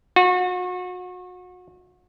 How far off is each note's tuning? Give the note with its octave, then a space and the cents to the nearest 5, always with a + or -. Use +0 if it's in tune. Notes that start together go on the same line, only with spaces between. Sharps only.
F#4 -35